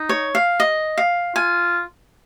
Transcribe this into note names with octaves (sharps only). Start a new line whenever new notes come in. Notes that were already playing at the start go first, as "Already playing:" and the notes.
Already playing: D#4
C#5
F5
D#5
F5
F4 G#5